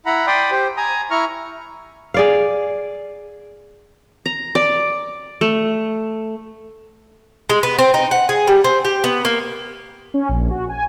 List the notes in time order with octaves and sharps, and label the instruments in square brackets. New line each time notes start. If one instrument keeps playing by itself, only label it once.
[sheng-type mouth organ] E4 F#5 A#5 B5
D5 G5 B5 C6 D#6
G4 C5
G#5 A#5 D#6
E4 A#5 C#6 F6
[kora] G#4 D5 F5
[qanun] A#5
D5
A3
[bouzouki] G#3
B3
C4
D#4
F#5
G#4
G3
C4
G4
B3
A#3
[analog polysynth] C#4
A#1
F#4
G#5